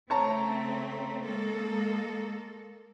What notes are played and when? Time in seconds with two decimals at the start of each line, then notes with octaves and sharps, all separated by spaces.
0.10 C#3 A3 C4 C#5 A5 A#5
1.24 G#3 A#3 A4